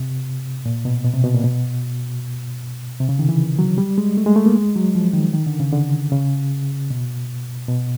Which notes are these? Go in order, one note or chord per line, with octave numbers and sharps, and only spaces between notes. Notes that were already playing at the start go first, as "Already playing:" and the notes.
Already playing: C3
A#2
B2
B2
C3
B2
A#2
B2
C3
C#3
D#3
E3
F#3
G3
G#3
A3
G#3
A3
A#3
G#3
F#3
F3
D#3
D#3
D3
C#3
D3
C#3
B2
B2